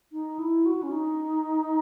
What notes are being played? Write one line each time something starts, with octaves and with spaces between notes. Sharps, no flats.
D#4
E4
F#4
C#4
D#4